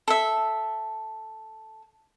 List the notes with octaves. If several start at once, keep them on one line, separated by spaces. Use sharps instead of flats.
A4 E5